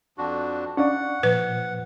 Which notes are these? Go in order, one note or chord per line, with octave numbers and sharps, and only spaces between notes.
F2 D4 F#4
C#4 D4 D5 F5 F#5 C#6
A#2 F3 B4